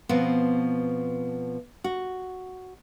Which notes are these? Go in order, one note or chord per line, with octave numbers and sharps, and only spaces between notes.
B2 F3 B3 C4
F#4